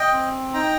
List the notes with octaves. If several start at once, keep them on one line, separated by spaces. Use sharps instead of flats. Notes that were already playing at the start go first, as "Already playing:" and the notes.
Already playing: D#5 G5
C4
D#4 G5 A#5